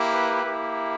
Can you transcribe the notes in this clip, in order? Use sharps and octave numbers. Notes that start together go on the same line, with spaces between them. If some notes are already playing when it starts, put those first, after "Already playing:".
Already playing: A#3 E4 G4
B4
A#3 E4 G4